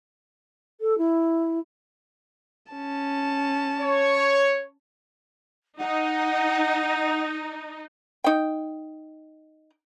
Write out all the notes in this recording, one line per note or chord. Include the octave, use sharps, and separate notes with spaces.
A4
E4
C#4 A5
C#5
D#4 F#5
D#4 G5